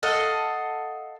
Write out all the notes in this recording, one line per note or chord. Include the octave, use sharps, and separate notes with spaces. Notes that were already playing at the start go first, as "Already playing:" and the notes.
A4 D#5 F5 F#5